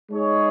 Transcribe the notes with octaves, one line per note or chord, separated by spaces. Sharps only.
G#3 D#4 G#4 C#5